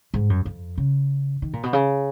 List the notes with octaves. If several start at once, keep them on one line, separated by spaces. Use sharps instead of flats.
G#2
F#2
F2
C#3
D#3
A#2
B2
C#3